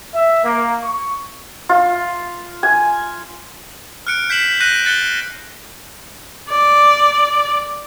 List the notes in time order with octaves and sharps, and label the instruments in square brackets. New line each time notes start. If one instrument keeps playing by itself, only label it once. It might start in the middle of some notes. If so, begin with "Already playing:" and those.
[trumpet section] E5
A#3
C#6
[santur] F4
G#5
[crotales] F6 F#6 C#7 D7
G6 B6 C7 E7 F#7
F#6 G6 A#6 C7 D#7
F#6 A6 C#7 G7
[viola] D5